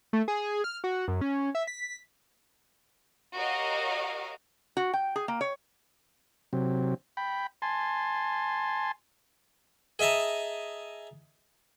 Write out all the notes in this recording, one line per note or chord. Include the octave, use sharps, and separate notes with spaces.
A3
G#4
F6
F#4
F#2
C#4
E5
B6
F#4 G4 A#4 C#5 D#5 F5
F#4
G5
G#4
A#3
C#5
C3 F#3 C4
G5 B5
G#5 A5 C6
G#4 D#5 E5 A5 A#5